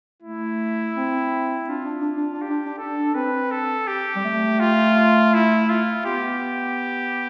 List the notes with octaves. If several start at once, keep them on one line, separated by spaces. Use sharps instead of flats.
A3 E4
C4
D4 F4
D4
D4
D4
D4
G4
D4
D4
D4 A4
C4 B4
A4
G4
G3
A3
F4
E4
F4
B3 G4